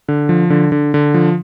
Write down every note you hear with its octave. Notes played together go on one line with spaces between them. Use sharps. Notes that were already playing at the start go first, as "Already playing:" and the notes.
D3
F3
D3
D3
D3
F3